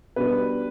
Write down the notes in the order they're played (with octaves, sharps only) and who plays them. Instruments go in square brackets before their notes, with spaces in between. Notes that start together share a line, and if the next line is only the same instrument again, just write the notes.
[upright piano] B2 G3 D4 B4